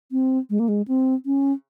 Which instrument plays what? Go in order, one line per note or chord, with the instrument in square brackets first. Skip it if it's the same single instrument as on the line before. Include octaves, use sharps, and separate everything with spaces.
[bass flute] C4
G#3
A#3
G#3
C4
C#4